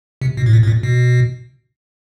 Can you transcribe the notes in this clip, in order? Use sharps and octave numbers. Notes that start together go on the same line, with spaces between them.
C3
B2
A2
A#2
A2
A#2
B2